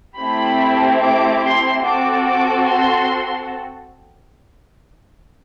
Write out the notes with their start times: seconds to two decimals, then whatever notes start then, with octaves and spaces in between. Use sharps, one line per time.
0.18 A3 C4 E4 G4 B5
1.02 D6
1.44 C6
1.84 C4 F#4 A4 D6
2.27 D6
2.68 C6